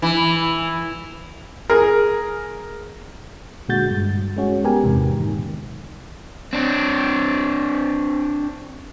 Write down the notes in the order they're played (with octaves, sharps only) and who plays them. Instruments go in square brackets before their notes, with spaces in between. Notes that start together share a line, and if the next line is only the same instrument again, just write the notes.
[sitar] E3
[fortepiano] G#4 A#4
[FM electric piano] A#2 D3 G#3 F#4 G6 A6
G2
G#3 C#4 F#4
B3 G4 A#4 G#5
E2 G#2 C3
A#2 D#3
[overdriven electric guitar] C4 D4